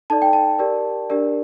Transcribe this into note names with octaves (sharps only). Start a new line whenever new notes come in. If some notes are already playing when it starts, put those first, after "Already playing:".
D#4 A4 D5 A5
G5
A5
G4 A#4 D5
D4 G4 A#4 D5